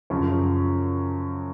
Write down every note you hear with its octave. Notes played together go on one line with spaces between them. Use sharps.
F#2 C#3 F3